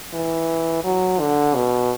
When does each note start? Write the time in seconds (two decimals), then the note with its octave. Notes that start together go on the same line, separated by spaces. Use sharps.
0.14 E3
0.84 F#3
1.20 D3
1.55 B2